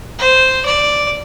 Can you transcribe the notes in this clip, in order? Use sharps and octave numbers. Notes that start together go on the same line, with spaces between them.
C5
D5